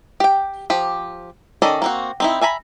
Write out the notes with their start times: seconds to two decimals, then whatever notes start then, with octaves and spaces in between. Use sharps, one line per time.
0.20 G4 G5
0.70 F3 G4
1.62 D#3 C#4 A4 D5 D#5
1.82 A#3 C4 F#4
2.20 C4 D#4 E4
2.41 E5 G#5 A#5 B5